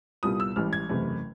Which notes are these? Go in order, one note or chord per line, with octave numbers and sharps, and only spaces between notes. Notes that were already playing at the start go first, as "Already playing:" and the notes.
C2 A#2 G3 B3 D#6
E6
A1 G#2 E3 G3 F6
G#6
F#1 E2 C3 E3 A3